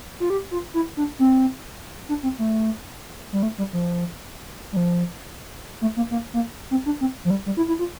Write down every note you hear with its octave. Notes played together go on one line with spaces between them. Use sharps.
F4
G4
F4
E4
D4
C4
D4
C4
A3
G3
A3
G3
F3
G3
F3
A3
A#3
A#3
A#3
C4
D4
C4
F3
G3
G3
E4
E4
F4